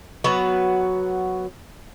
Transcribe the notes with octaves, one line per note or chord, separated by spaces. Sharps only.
F#3 B3 F#4 B4